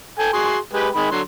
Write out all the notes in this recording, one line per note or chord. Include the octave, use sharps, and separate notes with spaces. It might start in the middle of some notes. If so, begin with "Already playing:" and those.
A4 G5 G#5
F#4 G#4 C6
G#3 G4 B4
D#3 G#3 B5
D3 F#3 C6